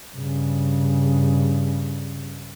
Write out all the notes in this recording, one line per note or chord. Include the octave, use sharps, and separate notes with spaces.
G2 C#3